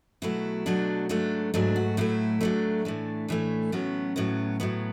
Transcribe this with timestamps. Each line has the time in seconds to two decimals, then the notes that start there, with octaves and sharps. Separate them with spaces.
0.22 B2 F#3 A3 E4
0.66 B2 F#3 A3 D4
1.09 G#2 F#3 A3 D4
1.54 G#2 F#3 A3 D4
1.76 F#4
1.97 A2 F#3 A3 E4
2.41 A2 F#3 A3 D4
2.85 A2 E3 A3
3.28 A2 E3 A3
3.72 A2 F#3 B3 C#4
4.16 A2 F#3 B3
4.60 A2 F#3 B3